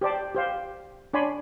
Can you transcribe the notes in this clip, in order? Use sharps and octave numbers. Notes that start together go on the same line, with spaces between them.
G4 C5 D5 A5
G4 C5 F5
D4 C#5 D5 G#5 B5 C6